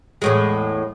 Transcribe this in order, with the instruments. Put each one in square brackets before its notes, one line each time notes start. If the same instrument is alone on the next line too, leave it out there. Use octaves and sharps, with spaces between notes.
[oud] E2 A2 G#3